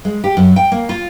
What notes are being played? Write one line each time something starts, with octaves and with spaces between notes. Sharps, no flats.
G#3
G4
F#2
G5
A#3
F4